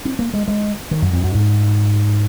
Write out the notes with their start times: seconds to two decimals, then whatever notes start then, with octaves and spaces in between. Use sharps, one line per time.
0.05 C4
0.19 A#3
0.34 G#3
0.48 G#3
0.91 D#3
1.02 F#2
1.13 F2
1.24 F#2
1.34 G#2